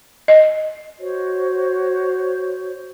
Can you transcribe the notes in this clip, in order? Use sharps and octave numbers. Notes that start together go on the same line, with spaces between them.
D#5
F#4 C5 C#5